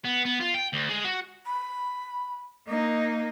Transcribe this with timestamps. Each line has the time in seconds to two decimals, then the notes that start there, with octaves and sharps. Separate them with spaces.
0.05 B3
0.25 B3
0.40 F4
0.54 G5
0.73 D2
0.89 G#3
1.04 F#4
1.46 B5
2.67 A#3 D#4 D#5